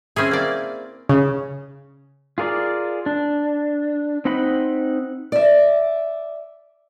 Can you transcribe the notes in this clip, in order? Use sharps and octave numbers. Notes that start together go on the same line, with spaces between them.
C4 C#4 E4 G#4
A#3 D5
C#3
F4 G#4 A#4 D5
D4
C4 D#4 D#5 F#5 B5
D5 E5